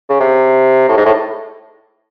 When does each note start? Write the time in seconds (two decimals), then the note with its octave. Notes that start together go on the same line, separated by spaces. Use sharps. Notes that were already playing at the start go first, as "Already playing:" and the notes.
0.09 C#3
0.20 C3
0.89 A2
0.97 G#2
1.05 A2